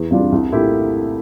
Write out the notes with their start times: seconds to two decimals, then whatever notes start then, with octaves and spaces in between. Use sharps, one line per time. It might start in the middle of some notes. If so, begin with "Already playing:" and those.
Already playing: E2
0.11 C3 G3 D4 F4
0.32 C2
0.52 A#2 A3 E4 G4